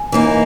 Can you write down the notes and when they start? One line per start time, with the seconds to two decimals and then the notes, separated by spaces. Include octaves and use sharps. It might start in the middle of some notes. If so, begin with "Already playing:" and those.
Already playing: G#5
0.12 E3 A#3 D#4